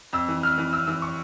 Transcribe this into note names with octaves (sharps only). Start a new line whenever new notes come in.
F2 E6
E3
F2 F6
E3
F2 E6
E3 E6
C#6